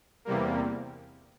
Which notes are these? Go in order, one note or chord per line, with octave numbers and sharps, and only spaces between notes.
E2 C3 G3 A#3